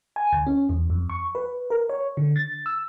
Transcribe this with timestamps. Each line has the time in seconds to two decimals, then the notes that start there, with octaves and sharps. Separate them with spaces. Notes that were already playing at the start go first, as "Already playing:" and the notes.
0.16 G#5
0.33 D2
0.47 C#4
0.69 E2
0.90 F2
1.10 C#6
1.35 B4
1.70 A#4
1.89 C#5
2.17 D3
2.36 A6
2.66 E6